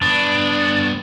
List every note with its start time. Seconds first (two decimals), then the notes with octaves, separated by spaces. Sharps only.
0.02 G2 B3 D4